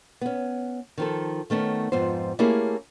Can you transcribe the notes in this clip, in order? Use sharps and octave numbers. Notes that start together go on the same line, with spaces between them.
B3 C#4
D#3 F3 A4
D#3 A3 B3 C#4
F2 G#2 F3 B3 C5
A3 A#3 C#4 E4 G4 G#4